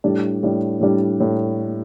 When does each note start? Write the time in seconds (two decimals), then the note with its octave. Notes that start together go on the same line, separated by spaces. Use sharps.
0.04 A2 G3 D4
0.43 A2 G3 D4
0.81 A2 G3 D4
1.20 A2 G3